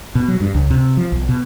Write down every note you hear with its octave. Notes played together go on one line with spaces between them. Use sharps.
B2
F#3
G2
C#2
C3
F3
B1
B2